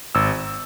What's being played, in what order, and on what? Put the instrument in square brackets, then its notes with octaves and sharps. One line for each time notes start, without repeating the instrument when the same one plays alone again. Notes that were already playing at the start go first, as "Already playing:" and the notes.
[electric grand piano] G#1 E6